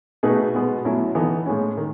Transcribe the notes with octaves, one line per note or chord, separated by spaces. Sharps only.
B2 A3 D#4 G#4 B4
B2 G#3 B3
B2 F#3 A3 C#4 E4
E3 B3 D#4 A4
A2 G#3 C#4
D#3